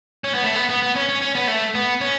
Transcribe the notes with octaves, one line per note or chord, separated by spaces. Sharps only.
C#4
B3
A3
B3
B3
B3
C#4
C#4
C#4
B3
A3
B3
C#4